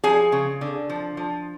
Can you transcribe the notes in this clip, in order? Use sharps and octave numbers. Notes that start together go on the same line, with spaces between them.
F3 G#4 G#5
C#3
D3
F3
F3